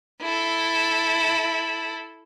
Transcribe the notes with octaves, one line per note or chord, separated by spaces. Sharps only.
E4 A4